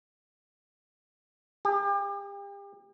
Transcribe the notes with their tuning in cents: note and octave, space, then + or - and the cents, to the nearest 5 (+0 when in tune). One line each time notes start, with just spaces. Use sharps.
G4 +40